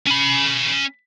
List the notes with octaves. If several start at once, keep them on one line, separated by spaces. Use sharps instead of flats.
C#4 B5